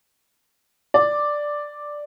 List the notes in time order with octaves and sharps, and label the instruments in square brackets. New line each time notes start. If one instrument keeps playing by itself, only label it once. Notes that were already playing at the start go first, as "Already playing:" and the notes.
[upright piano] D5